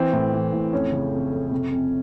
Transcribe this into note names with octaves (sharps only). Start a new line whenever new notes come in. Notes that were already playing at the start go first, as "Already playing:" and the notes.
Already playing: E3 C4
A2
E3
A2
F2 C#4
C#3
F2
F2
C3
F2